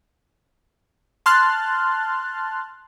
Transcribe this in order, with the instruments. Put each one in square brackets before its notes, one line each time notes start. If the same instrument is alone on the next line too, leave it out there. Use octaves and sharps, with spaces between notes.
[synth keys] A5 C6 F6 F#6 A6